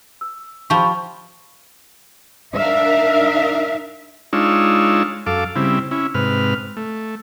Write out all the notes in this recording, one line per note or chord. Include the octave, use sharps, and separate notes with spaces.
E6
F3 G4 B5 C#6
D4 D#4 A#4 E5 F5
G#3 D4 D#4 F4 C#5 E6
F#2 A4 F5 D6
C#3 G3 C4 E4
C#4 E4
G#2 C3 B4 F6
A3